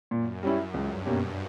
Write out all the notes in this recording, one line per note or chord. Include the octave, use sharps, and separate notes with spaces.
F#2 A#2
G3 C#4 E4
C#2 G2
B2 A#3 C#4 G4